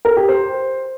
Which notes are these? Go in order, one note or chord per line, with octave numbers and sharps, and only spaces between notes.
A#4
G4
C5